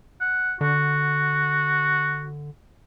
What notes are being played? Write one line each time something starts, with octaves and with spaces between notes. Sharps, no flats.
F#5
D3 F#4